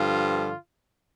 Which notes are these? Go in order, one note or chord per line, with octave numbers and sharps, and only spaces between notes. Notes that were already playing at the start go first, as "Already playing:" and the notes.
Already playing: G2 D3 F3 F4